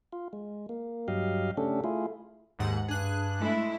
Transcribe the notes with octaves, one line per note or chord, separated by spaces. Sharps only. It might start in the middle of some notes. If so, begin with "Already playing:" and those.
F4
G#3
A#3
G2 F#3 G4 D#5 F5
C#3 A3 C#4 D4 G4 A4
A3 E4 F4 G#4
D#2 G#2 F#5
G2 D4 G#4 F#6
G#3 A3 E4